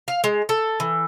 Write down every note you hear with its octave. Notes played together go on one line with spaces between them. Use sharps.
F5
G#3
A4
E3